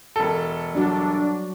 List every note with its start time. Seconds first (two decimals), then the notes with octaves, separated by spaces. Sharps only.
0.16 E1 A4
0.74 F#3 G3 D4 F#4